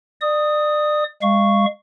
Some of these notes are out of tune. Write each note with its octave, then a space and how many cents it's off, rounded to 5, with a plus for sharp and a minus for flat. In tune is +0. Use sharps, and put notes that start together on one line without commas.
D5 +30 D#6 +0
G#3 -35 F5 -20 C#6 +0